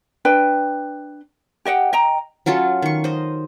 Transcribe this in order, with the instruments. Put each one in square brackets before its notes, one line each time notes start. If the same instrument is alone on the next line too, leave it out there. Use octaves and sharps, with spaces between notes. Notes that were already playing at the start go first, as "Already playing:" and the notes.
[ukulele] D4 B4 G5
G4 D#5 F#5 G5
D#5 G5 A#5
[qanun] F#3 C#4 F4 A4
D#3 C#6
C5 D#5